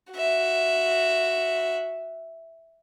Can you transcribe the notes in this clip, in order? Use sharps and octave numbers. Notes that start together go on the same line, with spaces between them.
F#4 E5